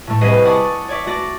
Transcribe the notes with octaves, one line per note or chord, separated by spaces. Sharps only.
A2 A3
C2 G#4 B4 D#5 C7
D5 F#5 G#5 A5 C#6 D#6
C#5 D5 E5
A3 F#4 D5 A#6